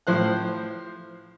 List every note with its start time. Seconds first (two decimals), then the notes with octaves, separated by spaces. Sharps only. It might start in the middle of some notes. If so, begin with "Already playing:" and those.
0.07 A2 F3 C5 F#6